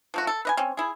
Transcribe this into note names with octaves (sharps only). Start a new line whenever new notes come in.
F3 A3 F#4
A4
B4 D#5 G#5
C4 C#4
E4 G#4